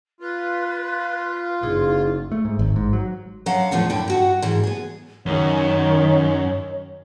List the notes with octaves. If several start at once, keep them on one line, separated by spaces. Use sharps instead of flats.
F4 B4
F#1 D#4 E4 G#4
A3
G#2
G#1
G#2
F#3
D3 F#3 F5 F#5
E2 A2 F3 A3 B3
G2 D3 E4 G5
G2 F#4 F#5
G#2 E3 G#3
B3 G#4
F#2 D#3 C#5